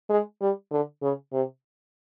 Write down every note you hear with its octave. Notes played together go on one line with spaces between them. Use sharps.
G#3
G3
D3
C#3
C3